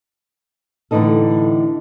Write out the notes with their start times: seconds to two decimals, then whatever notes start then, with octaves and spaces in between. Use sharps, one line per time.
0.91 A2 D3 E3 D#4 A4